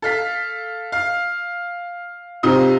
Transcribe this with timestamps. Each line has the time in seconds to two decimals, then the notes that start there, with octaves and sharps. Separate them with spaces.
0.02 A4 F5 B6
0.92 F5
2.43 C3 D#4 F4 D#6